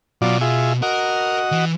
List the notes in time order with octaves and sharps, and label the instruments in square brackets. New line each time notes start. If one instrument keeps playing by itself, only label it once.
[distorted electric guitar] B2 [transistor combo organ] F#3 F4 D5
[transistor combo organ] F4 G#4 E5
[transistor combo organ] F#4 D#5 F#5 [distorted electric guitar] A#4
[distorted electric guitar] E3